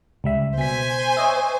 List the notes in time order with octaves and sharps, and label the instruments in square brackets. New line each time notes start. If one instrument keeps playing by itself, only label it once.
[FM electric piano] C#2 G3 E5
[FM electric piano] B2 B6 [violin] C5 G#5
[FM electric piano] C#5 D#5 E5